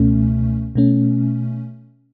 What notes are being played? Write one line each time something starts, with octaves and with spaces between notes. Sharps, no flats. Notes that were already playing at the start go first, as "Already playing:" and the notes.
Already playing: C#2 B2 A3 C#4
B2 A3 C#4